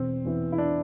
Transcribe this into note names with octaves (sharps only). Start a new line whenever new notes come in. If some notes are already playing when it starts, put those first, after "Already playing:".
Already playing: E1 C4
E2 E3
E4
D4